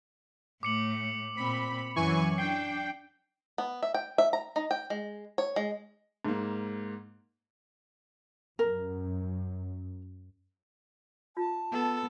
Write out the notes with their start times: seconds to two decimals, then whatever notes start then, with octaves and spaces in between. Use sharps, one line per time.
0.63 A2 A3 D6 C#7 F#7
1.37 A#2 C4 B5
1.96 F#2 E3 F#3 G#5 C#6
2.38 D4 G5 C7
3.58 B3
3.83 E5
3.94 G5
4.18 E5
4.33 A#5
4.56 D#4
4.71 G5
4.90 G#3
5.38 C#5
5.56 G#3
6.25 G#2 A#3
8.59 F#2 A#4
11.37 F4 A5
11.72 B3 A4